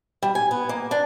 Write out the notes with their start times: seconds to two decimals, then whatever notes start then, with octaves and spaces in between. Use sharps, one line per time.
0.23 G3
0.35 G#5
0.51 B3
0.69 A#3
0.91 D4